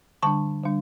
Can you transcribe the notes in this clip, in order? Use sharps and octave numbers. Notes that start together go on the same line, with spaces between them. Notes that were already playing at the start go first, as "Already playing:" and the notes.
D3 G3 D4 A5 C#6
D3 G3 D4